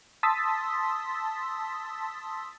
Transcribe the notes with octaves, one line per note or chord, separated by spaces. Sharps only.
A5 C6 D#6 E6 A6 B6